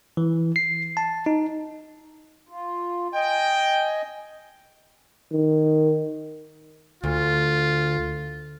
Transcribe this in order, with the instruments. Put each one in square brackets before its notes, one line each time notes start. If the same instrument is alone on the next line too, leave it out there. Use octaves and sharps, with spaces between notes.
[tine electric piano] E3
C7
A5
D#4
[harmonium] F4
[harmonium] D#5 G#5 [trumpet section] G5
[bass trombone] D#3
[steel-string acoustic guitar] D2 [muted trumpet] F4